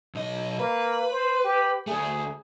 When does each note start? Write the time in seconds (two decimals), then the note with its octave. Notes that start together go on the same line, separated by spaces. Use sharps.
0.15 B1 D#5
0.59 A#3 B4
1.12 C5
1.45 G4
1.87 D2 A3 G#4